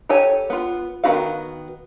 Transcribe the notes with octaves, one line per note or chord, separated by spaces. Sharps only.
G4 A4 C#5 G#5
B3 F4
D#3 B3 E4 F#4 F5